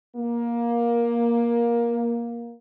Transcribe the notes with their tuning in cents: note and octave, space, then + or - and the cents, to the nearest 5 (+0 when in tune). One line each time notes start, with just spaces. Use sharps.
A#3 +15